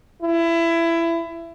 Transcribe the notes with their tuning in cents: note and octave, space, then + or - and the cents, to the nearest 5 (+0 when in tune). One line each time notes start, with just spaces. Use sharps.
E4 +20